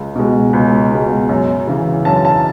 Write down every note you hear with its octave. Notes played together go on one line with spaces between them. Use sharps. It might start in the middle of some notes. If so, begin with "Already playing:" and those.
Already playing: C#2
B2 G#3
C#2
B2 G#3
F#2
C#3 E3
F#2 A5
A5